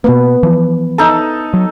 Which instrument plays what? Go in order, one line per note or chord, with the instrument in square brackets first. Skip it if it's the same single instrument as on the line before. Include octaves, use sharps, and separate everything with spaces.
[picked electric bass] B2 A#3 [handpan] B3 B4
[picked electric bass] E3 F3
[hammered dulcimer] D#4 A4
[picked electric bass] F#3